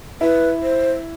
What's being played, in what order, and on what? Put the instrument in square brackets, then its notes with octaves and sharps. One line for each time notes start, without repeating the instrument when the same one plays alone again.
[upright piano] E4 [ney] B4
[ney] C5